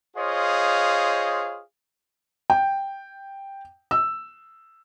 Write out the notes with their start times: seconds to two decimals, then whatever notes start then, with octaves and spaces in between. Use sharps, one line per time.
0.16 F4 G#4 C5 C#5 D#5 F5
2.50 G5
3.91 E6